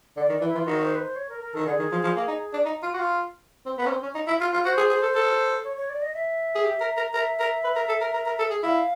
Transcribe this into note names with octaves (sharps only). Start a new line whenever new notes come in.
D3 D5
D#3
E3
E4
E3 F4
D#3 F#4
C5
B4
C5
C#5
A#4
A#4
D#3 A4
D3 G#4
D#3
F3
F3
A#3
D#4
D4
D#4
F4
F#4
F4
C4
B3
C#4
C4
C#4
D#4
E4
F4
F4
F#4 C5
G#4
G#4
A4
A4
C#5
C#5
D5
D#5
E5
G#4
G4
A#4
A#4
A#4 E5
A#4
B4
A#4
A4
A#4
A#4
A#4
A4
G#4
E4 F5